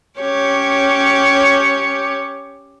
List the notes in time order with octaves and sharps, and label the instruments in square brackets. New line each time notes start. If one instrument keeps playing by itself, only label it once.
[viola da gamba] C#4 G4 C#5